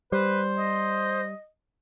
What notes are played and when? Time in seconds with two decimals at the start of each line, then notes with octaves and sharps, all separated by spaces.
0.12 G3 B4 C5
0.58 D#5